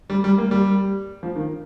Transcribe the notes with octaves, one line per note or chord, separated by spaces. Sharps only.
G3
G3
A#3
G3
F3
D#3